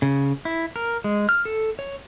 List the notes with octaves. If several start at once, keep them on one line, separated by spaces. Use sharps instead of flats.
C#3
E4
A#4
G#3
F6
A4
C#5